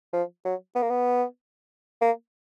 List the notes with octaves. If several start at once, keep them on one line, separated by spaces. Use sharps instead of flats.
F3
F#3
B3
A#3
B3
A#3